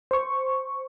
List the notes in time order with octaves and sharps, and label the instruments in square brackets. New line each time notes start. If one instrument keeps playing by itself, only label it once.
[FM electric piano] C5 C#6